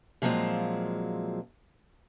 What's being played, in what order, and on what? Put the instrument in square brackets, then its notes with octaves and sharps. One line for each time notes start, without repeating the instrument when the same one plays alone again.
[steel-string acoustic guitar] A#2 F3 F#3 G#3 C4